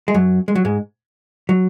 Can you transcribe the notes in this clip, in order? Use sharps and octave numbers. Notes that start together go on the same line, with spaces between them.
G#3
F#2 F#3
G#3
F#3
G#2 G#3
F#3